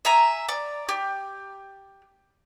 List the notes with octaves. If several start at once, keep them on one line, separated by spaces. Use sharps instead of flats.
E5 G#5 A#5
D5
G4